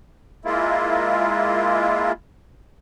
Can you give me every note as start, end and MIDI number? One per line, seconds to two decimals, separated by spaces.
0.45 2.12 56
0.45 2.12 58
0.45 2.12 64
0.45 2.12 65